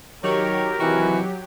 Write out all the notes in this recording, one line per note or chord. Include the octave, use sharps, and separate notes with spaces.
D#3 F#3 G4 A#4 C#5
C3 D#3 E3 F#4